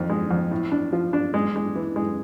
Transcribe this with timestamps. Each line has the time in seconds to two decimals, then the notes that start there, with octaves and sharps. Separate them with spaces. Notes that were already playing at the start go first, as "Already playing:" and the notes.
Already playing: F2 D#3
0.09 G#3
0.31 F2
0.51 A2
0.72 D4
0.93 F3
1.13 D4
1.34 G#3
1.56 G#3
1.75 E3
1.96 G#3